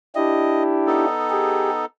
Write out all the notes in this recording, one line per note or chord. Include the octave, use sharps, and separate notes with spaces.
D4 E4 G4 D#5
B3 D#4 A4
G4 G#4